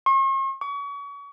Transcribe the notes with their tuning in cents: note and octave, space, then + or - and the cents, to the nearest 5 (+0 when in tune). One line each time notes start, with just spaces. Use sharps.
C#6 -45
C#6 +35